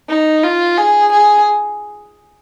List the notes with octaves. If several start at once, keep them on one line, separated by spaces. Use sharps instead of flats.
D#4
F4
G#4
G#4